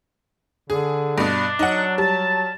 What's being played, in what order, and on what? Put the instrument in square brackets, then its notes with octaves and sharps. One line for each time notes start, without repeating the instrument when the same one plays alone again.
[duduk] D3 [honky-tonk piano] G#4
[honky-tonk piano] G2 B2 [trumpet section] D4
[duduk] F#3 [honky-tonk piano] D#4 F#5
[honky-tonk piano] G3 [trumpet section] A5